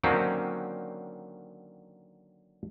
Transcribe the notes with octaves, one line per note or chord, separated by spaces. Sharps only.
D3 D#3 F#3 A#3 C4 C#4